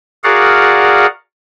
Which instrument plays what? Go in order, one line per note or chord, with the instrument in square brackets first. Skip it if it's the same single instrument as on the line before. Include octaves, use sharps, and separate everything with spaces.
[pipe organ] F#4 G#4 A#4 D5 F5 F#5